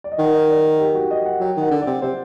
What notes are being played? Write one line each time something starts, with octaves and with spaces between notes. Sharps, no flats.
D5
D#5
D#3 F#5
D#5
D5
A#4
G4
F#4
D#5
F#5
F#3 G5
D#3 F#5
D3
D5
C3
C3 C5